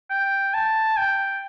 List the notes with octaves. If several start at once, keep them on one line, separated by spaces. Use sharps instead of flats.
G5
A5
G5